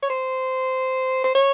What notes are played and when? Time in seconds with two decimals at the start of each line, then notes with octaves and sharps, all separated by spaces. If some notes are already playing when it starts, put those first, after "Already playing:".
0.02 C#5
0.10 C5
1.24 C5
1.35 C#5